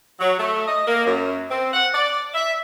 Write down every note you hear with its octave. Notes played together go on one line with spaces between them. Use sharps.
F#3
A3
D#5
A#3
F#2
C4
F#5
D5
E5